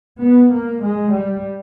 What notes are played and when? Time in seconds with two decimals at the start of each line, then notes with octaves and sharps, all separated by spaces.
0.21 B3
0.52 A#3
0.82 G#3
1.13 G3